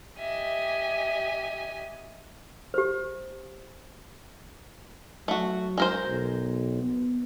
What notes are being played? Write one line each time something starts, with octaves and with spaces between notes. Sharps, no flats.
G4 D#5 E5 G#5
G4 C5
F#3 A3 F#4
G#3 A#4 C5
B1
B3